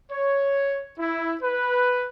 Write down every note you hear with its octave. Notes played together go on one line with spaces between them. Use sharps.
C#5
E4
B4